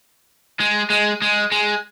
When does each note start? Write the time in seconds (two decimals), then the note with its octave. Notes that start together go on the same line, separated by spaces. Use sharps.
0.60 G#3
0.90 G#3
1.22 G#3
1.52 G#3